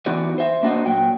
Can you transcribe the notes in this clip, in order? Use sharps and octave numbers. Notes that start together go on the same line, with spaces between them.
E3 B3 D#4 F#4 D5
C5 E5
A#3 D4 F#4 B4 C5 D#5
A#2 F#3 G5